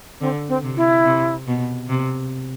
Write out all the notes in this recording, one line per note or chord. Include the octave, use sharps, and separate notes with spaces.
D3 C4
C4
C3
E4
C3
B2
C3